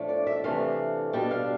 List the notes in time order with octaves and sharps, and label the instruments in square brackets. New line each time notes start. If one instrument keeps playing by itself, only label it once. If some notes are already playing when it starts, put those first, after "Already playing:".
Already playing: [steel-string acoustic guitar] A2 F3 A3 D4
D5
E5
C3 E3 A3 D4 F5
B2 G3 D4 G5
F5